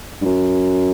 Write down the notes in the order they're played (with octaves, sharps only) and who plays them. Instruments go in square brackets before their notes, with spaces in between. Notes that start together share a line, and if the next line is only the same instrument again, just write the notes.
[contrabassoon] G2
F#2